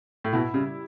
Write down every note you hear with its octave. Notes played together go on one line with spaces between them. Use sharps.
A2
B2 E4
C#3 G3